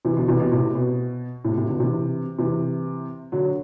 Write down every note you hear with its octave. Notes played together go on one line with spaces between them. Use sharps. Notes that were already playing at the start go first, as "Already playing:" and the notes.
C3 E3
B2 D3
C3 E3
B2
A2 C3
B2
A2 C3
A2 C3
B2 D3
C3 E3
C3 E3
D3 F#3